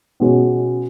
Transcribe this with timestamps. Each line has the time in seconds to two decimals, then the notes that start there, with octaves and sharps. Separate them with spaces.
0.20 B2 G#3 C#4 F#4